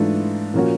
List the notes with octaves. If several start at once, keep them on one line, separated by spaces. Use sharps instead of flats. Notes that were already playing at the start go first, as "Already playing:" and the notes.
Already playing: G#2 E3 A3 D4 F4
A#2 F3 A#3 C#4 F#4